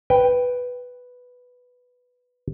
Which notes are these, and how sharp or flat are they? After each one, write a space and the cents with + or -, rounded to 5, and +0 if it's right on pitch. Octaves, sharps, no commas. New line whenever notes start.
B4 +0 G5 +0